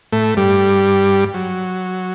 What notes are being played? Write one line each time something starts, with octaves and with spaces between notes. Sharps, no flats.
A2 A3
G2 G3
F#3